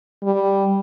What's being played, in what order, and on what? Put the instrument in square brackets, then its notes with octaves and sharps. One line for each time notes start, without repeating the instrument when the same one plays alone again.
[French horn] G3